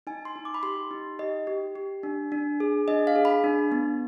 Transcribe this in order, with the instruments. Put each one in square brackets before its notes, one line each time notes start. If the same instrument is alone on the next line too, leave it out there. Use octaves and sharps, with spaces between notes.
[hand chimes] D#4 G#5
C6
D#4
D6
B5
G4 C6
D#4
G4 D#5
G4
G4
D4
D4
G#4
D4 D#5
F5
G#4
B5
D4
B3